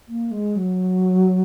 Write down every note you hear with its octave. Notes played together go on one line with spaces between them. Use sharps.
A#3
G#3
F#3